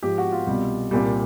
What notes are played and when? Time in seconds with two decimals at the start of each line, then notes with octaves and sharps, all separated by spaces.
0.03 G#2 F3 G4
0.18 F#4
0.32 F4
0.47 C2 B2 G3
0.91 C2 A#2 G3